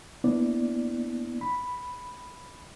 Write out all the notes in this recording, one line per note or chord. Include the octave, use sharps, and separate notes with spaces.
A#3 B3 D4 E4 D5
B5